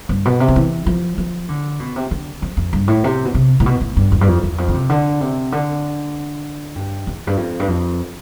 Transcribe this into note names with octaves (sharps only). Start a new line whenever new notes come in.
G2
B2
C3
D3
E3
F3
F3
D3
B2
C3
D3
F2
F2
G2
A2
C3
B2
C3
A2
B2
A2
G2
E2
G2
F2
E2
F2
D3
C3
D3
C3
D3
G2
E2
G2
F2
G2
F2